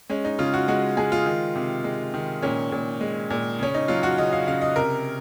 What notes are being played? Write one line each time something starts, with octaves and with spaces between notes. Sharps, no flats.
G#3 C#4
D#4
C#3 F4
F#4
G#3 F#4
G#3 G#4
F4
D#3
C3
G#3
D#3
A#2 C#4
A#2
G#3
A#2
C#3 C#4
D#4
F#3 F4
F#4
C#3 D#5
F5
C#3 F5
D#5
C3 A#4